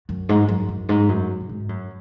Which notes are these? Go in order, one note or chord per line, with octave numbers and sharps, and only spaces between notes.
F#2
G#2
F#2
F#2
G#2
F#2
A2
G#2
F#2